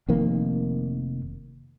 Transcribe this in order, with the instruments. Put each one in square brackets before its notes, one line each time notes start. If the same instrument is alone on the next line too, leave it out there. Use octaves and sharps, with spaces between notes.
[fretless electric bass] F1 F2 D#3 A#3